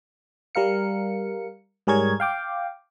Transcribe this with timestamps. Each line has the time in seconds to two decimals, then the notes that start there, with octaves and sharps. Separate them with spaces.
0.55 G3 A#4 F5 C#7
1.87 G#2 G3 G#4 A#4 C#5 G#6
2.20 F5 G5 D6